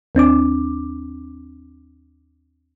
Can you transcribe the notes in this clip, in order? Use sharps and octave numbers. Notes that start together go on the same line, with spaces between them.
D#2 C4 D4 D6